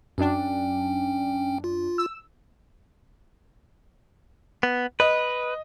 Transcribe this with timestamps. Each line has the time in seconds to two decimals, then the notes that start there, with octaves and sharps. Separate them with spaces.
0.18 F#2 C#4 D4 G5
1.64 F4
1.98 E6
4.63 B3
5.00 B4 D#5